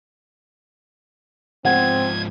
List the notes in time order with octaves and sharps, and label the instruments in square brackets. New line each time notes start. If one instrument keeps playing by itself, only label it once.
[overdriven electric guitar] G#2 F3 [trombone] C4 [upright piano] F#5 [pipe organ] G#6